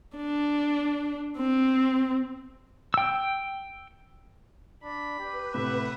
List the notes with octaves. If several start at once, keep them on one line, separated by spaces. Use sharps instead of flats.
D4
C4
G5 E6
D4 B5
G4 B4
A2 C3 E5 F#5